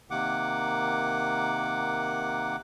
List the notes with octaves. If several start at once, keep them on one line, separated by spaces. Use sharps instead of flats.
C3 D#3 A#3 F#5 D6